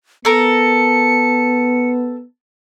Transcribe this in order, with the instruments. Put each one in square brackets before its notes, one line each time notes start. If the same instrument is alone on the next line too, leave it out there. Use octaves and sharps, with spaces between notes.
[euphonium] B3 [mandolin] A4 A#4 [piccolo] C#7